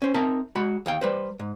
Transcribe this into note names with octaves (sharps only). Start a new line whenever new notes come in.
C#4 C5
C4 D#4 A#4 E5 A5
G#3 F#4 B5
D#2 F5 G5
G3 B4 C5
G#2